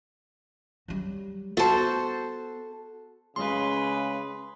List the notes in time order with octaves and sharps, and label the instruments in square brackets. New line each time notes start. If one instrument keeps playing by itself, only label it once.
[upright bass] F#3 G3
[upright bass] B3 [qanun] F#4 C5 [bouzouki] A4 A5
[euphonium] C#3 [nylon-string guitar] G#3 C#4 F4 [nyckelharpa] G#4 B4 [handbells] C6